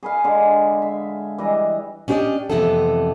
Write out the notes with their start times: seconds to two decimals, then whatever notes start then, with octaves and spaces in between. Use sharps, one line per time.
0.03 G#4 B4 F5
0.24 D3 G#3 G#4
0.82 E5
1.38 E3 G3 D#5
2.08 C#4 D4 G4 C5 D5 D#5
2.50 F2 C3 E3 A3 B3 A4